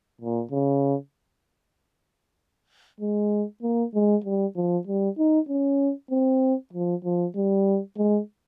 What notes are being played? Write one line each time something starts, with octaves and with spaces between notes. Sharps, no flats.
A#2
C#3
G#3
A#3
G#3
G3
F3
G3
D#4
C#4
C4
F3
F3
G3
G#3